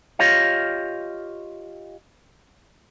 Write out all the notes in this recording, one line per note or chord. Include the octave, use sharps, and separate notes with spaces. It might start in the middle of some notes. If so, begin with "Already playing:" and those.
F4 G4 C#5 D#5 F5